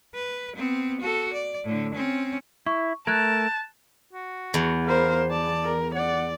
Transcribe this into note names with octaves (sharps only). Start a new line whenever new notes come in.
B4
B3 C4
F#4 A4
D5
A2 D3
C4 C#4
E4 C#6
A3 A#4 A5 F#6 G#6
F#4
E2
A#4 C5 F5
D5 A5
A#4
D5 F#5